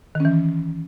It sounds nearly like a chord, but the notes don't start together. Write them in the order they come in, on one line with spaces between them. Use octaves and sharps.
D#3 C#4 E3